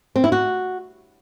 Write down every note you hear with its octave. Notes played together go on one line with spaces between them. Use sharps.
C4
E4
F#4